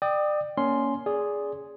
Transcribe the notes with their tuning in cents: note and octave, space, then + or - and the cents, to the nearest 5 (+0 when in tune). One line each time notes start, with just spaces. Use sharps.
D5 +30 G5 +0 D#6 +15
A#3 +10 C#4 +10 C6 +0
G#4 +0 D5 -15